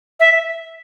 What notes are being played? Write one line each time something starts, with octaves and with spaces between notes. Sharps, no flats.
E5